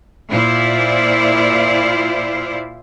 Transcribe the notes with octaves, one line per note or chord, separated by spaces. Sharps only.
A#2 E4 F4 C5 D5